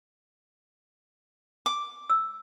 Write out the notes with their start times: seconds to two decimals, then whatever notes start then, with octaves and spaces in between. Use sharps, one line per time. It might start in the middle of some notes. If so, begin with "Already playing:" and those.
1.66 D6
2.10 E6